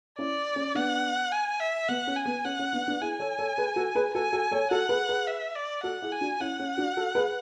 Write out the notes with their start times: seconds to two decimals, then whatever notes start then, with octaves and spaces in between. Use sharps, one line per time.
0.18 C#4 E4 D5
0.56 C#4
0.75 B3 D4 F#5
1.32 G#5
1.60 E5
1.88 B3 F#5
2.07 C#4
2.16 G#5
2.25 B3
2.45 C#4 F#5
2.59 C#4
2.73 B3 D4
2.87 B3 D4
3.01 E4 G#4 G#5
3.20 A4 C#5
3.39 A4 C#5
3.57 G#4 B4
3.76 F#4 A4
3.95 G#4 B4
4.15 F#4 A4 G#5
4.32 F#4 A4
4.51 A4 C#5
4.71 F#4 A4 F#5
4.89 G#4 B4
5.09 G#4 B4
5.27 E5
5.55 D5
5.83 F#4 A4 F#5
6.02 E4 G#4
6.12 G#5
6.21 D4 F#4
6.40 C#4 E4 F#5
6.60 C#4
6.77 D4 F#4
6.97 F#4 A4
7.15 G#4 B4